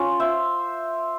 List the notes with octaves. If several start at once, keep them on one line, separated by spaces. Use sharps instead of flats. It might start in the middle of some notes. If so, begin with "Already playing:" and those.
Already playing: C#4 F4
C5 E5